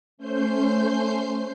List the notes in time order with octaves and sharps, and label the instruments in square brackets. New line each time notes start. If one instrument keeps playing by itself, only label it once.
[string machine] A3 C#4 C5 G6 C7